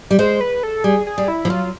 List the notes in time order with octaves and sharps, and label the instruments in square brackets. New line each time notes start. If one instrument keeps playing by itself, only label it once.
[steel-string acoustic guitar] G3
[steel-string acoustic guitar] G#3 [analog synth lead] C5
[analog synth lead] B4
A4
[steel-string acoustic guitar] G3 [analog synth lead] G#4
[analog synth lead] G#4
[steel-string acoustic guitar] G3
[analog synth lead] E4
[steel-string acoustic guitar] F3
[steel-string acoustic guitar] F#3 [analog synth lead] F4